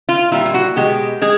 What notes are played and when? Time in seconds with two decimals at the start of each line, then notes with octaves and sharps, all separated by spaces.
0.09 F4
0.32 A#2 G3 E4
0.46 F4
0.54 F#4
0.76 B2 G#3 G4
1.22 G#3 G#4